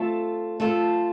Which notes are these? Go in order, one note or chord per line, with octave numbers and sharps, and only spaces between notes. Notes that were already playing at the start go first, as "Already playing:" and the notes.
Already playing: A3 C4 F4 A4
A3 C4 F4 A4